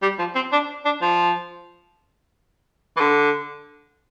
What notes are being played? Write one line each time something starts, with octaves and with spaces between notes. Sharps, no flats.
G3
F3
C4
D4
D4
F3
E3
D3